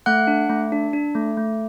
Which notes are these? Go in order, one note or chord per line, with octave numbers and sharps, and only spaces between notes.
A3 F#5 F#6
D4
A3
D4
D4
A3
A3